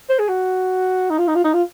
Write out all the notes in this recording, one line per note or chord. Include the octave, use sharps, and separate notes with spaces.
C5
G#4
F#4
D#4
F4
D#4
F4
D#4
F4